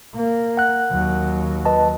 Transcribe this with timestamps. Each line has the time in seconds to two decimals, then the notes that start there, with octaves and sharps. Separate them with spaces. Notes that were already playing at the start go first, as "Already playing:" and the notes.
0.14 A#3
0.57 F#5 F#6
0.91 D#2 F#3
1.65 B4 D#5 A5